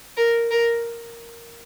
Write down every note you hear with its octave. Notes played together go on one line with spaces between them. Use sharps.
A#4
A#4